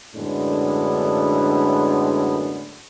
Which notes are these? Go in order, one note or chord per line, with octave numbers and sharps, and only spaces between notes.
F#2 A2 D3 G#3 B3 D4